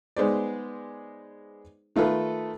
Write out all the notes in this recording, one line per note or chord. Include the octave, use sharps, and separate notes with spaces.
G#3 B3 D#4 G#4 C5 D5
D#3 A3 F4 A4 B4